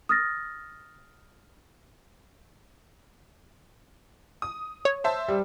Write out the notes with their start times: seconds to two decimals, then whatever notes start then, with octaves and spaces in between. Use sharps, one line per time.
0.09 D#6 F6 A6 A#6
4.42 D#6
4.85 C#5
5.04 C5 E5 A5
5.28 G3